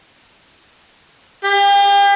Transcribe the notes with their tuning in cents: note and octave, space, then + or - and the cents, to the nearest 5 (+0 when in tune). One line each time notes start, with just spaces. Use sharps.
G4 +40